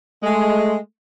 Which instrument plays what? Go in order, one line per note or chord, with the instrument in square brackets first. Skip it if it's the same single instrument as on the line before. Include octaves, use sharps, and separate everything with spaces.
[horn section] G#3 [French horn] A3